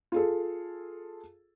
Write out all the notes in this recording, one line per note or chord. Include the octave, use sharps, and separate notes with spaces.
F4 G#4 A4